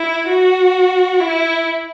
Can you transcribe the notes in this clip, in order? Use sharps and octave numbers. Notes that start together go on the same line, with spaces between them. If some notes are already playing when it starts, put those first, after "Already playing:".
Already playing: E4
F#4
E4